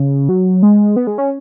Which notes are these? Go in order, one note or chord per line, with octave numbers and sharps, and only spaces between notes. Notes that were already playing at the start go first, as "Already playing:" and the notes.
Already playing: C#3
F#3
G#3
B3
G#3
C#4